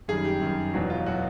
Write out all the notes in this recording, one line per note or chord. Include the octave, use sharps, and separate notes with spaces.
F#2 D#3 G3 G#4
G4
F#2 D#3 G3
E1 E2 B2 F#3 F#4
F4
B2 F#3 F#4